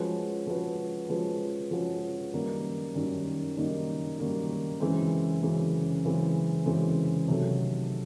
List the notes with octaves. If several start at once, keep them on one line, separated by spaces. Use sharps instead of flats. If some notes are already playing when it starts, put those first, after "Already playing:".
Already playing: F3 G#3 C#4 F#4 B4
F3 G#3 C#4 F#4 B4
F3 G#3 C#4 F#4 B4
F3 G#3 C#4 F#4 B4
F#2 D#3 G3 A#3 D#4
F#2 D#3 G3 A#3 D#4
F#2 D#3 G3 A#3 D#4
F#2 D#3 G3 A#3 D#4
F#2 C#3 E3 G#3 C4
F#2 C#3 E3 G#3 C4
F#2 C#3 E3 G#3 C4
F#2 C#3 E3 G#3 C4
C3 D#3 F#3 A3